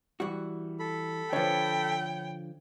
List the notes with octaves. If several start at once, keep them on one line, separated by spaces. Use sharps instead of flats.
E3 G3 F#4
A4 B5
D3 F3 B4 C#5 G5